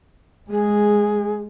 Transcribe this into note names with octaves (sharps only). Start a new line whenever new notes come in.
G#3 G#4